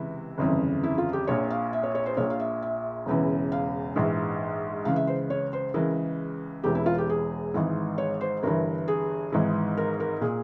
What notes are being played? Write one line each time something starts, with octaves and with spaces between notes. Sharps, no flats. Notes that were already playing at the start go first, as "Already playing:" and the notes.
Already playing: C#2 C3 E3 E4
G1 F2 C#3 E3
E4
F4
G4
A#1 A#2 C#5
F5
E5
C#5
C#5
C5
A#1 A#2 C#5
F5
E5
E5
E1 E2 C#3 E3
F5
A#1 G#2 E3
C#2 C#3 E3 F5
E5
C5
C#5
C5
C#2 C#3 E3 A#4
E1 E2 E3 G4
E4
F4
G4
G#4
G#1 G#2 E3
C#5
C5
G1 G2 E3 A#4
G#4
G#1 G#2 E3
A#4
A#4
A#2 G#4